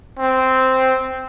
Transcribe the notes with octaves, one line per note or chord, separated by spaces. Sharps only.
C4